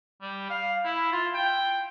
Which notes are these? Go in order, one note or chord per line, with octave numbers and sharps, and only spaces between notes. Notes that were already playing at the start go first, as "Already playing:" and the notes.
G3
F5
E4
F4
G5